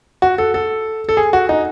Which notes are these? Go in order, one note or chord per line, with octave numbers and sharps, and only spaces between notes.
F#4
A4
A4
A4
G#4
F#4
D#4